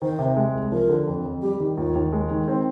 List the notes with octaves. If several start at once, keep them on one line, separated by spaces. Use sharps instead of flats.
D#3 C5
C3
G#3
C2
F3 A#4
D3
F2
F2
G3 G4
D#3
D#2 F4
D#2
G#3
D#3
C4 D#4